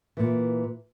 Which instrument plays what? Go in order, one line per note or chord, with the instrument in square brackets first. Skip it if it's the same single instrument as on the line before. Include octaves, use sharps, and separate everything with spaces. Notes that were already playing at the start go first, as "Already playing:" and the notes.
[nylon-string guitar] A#2 E3